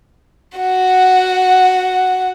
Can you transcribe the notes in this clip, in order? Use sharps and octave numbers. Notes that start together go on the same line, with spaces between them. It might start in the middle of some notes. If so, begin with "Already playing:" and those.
F#4 F#5